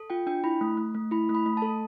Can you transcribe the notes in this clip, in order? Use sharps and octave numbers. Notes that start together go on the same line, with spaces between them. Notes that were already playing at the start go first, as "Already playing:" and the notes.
Already playing: A4
F4 G5
D4 G5
E4 B5
A3
A3
A3
E4 B5
A3
B5
A3
A5
A4